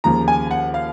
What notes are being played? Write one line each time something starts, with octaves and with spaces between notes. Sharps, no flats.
D#2 C#3 F3 A#5
G#5
F#5
F5